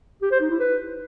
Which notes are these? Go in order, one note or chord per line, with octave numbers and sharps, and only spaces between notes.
G4
C5
D#4
E4
B4